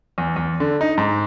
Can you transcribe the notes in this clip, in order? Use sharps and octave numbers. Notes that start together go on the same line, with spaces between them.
E2
E2
D3
D#4
G#2